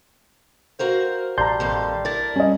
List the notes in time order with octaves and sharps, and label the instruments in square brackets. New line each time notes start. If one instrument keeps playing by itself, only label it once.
[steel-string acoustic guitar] F#4 A#4 F5 [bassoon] C5
[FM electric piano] A1 C6 G6 [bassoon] G3 [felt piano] A5 A#5
[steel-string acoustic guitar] F2 D#3 F5
[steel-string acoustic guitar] E4 A#4 [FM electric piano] D5 A6
[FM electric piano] G3 [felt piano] C#4 D#5